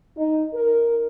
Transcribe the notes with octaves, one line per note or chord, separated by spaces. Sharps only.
D#4
A#4